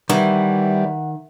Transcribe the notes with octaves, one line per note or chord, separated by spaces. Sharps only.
D#3 E3 G3 F#5